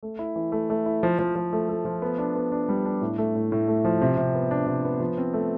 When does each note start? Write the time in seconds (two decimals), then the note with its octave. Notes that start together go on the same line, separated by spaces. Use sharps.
0.03 A3
0.19 E4
0.36 E3
0.52 A3
0.70 A3
0.86 E4
1.03 F3
1.19 F3
1.35 F3
1.53 A3
1.69 A3
1.85 F3
2.02 B3
2.18 D4
2.35 B3
2.52 D4
2.69 G3
2.85 D4
3.02 A2
3.18 A3
3.35 A2
3.52 A2
3.68 A3
3.85 F3
4.01 C3
4.17 C3
4.35 B3
4.51 D4
4.67 C3
4.85 B3
5.00 F3
5.18 C4
5.34 A3